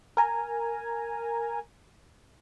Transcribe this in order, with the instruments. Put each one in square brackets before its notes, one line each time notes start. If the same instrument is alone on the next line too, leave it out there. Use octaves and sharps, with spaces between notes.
[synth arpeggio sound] A#4 G#5 A#5